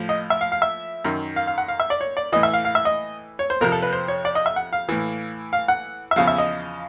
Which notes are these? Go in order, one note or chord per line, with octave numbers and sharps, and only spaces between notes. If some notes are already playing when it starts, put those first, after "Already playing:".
Already playing: A2 F3
D#5
E5
F5
F5
E5
F#2 D#3
F5
F5
F#5
F5
E5
D5
C#5
D5
A2 E3 D#5
E5
F5
F5
E5
D#5
C#5
C5
F2 C3 F3 A#4
A4
B4
C5
C#5
D5
D#5
E5
F#5
F5
A2 E3
F5
F#5
E5
E2 C#3 F3 F5
E5
D#5